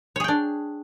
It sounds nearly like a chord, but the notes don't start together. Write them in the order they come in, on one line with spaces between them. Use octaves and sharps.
C#5 G#4 G5 D4